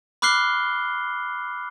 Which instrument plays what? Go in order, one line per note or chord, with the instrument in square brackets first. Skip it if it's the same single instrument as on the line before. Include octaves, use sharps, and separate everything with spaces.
[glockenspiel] B5 D6 F6 F#6 C7 G7